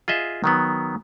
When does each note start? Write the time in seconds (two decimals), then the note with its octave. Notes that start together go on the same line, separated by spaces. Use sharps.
0.08 F4 G#4 D#5 E5
0.44 D#3 F#3 B3